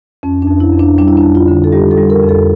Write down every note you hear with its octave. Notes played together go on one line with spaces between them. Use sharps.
F2 C#4
D4
F2
E4
F2
D4
G3 D4
E4
D4
F2
F4
D3
A4
G3 G4
A4
G3
A#4
F2
A4